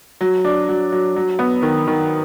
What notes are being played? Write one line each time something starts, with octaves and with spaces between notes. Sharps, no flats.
F#3
D4
F#3
F#3
F#3
B3
D#3
D#3